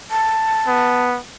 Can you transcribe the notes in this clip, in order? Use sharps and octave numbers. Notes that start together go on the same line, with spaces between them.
A5
B3